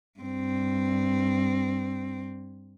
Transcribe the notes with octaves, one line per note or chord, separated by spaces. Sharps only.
G2 C4